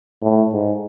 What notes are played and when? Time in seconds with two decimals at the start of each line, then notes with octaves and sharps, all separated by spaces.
0.22 A2
0.53 G#2